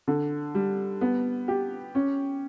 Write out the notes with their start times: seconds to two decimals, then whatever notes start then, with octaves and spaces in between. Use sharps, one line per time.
0.08 D3
0.55 G3
1.01 B3
1.48 G4
1.95 C#4